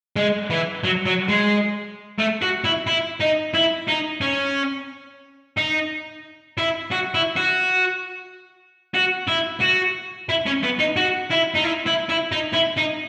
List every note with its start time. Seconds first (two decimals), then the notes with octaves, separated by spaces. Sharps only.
0.16 G#3
0.51 E3
0.84 F#3
1.06 F#3
1.28 G#3
2.19 A3
2.42 F#4
2.64 E4
2.87 E4
3.20 D#4
3.54 E4
3.88 D#4
4.21 C#4
5.57 D#4
6.58 E4
6.92 F#4
7.14 E4
7.36 F#4
8.94 F#4
9.28 E4
9.61 F#4
10.29 E4
10.47 C#4
10.63 B3
10.79 D#4
10.96 F#4
11.30 E4
11.54 D#4
11.64 E4
11.86 E4
12.09 E4
12.32 D#4
12.54 E4
12.77 D#4